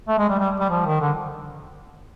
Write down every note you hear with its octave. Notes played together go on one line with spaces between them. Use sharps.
A3
G#3
G3
G3
G3
F3
D#3
D3